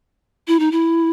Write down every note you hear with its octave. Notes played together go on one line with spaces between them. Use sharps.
E4
D#4
E4